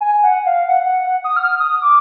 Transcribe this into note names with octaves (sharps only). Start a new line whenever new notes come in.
G#5
F#5
F5
F#5
D#6
F6
D#6
D6